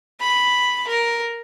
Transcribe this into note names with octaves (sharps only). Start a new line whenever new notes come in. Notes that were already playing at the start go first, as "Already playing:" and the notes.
B5
A#4